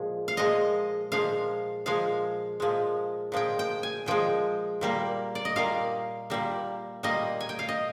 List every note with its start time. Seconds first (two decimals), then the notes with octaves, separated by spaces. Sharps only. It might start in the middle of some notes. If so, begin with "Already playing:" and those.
Already playing: A#2 F3 G#3
0.28 F5
0.37 A#2 F3 G#3 D#5
1.12 A#2 F3 G#3 F5
1.86 A#2 F3 G#3 F5
2.60 A#2 F3 G#3
3.32 A#2 F3 G#3 G5
3.59 G5
3.83 G#5
4.06 A#2 F3 G#3 G5
4.81 A#2 G3 A#3
5.35 D5
5.45 D#5
5.56 A#2 G3 A#3 F5
6.30 A#2 G3 A#3
7.03 A#2 G3 A#3 D#5
7.41 G#5
7.49 G5
7.59 F5
7.69 D#5